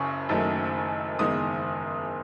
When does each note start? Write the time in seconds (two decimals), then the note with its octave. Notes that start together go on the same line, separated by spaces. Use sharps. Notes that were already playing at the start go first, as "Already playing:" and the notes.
Already playing: F#1 F#2 C#3 C#6
0.29 F#1 F#2 D#3 F#3 A3
1.19 F#1 E2 D#3 G#3 D#6